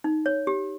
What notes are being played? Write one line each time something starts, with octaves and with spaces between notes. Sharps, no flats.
D#4
C#5
G4